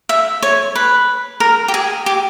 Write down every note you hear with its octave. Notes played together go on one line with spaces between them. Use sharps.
E5
C#5
B4
A#4
G4
G#4
G4